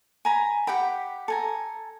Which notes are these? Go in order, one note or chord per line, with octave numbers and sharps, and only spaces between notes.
G#5 A#5 B5
G4 F#5 G5 B5
A4 G#5 A#5